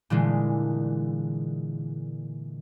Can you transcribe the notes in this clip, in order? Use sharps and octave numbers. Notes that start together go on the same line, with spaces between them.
A#2 D3 E3 G#3